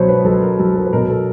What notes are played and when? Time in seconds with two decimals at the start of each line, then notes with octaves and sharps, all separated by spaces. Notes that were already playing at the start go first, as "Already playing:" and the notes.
Already playing: B2 F#3 C5 C#5
0.09 B4
0.25 F#3 A4
0.42 A#4
0.59 F#3 A4
0.76 A#4
0.86 B4
0.93 B2 A#4
1.09 A4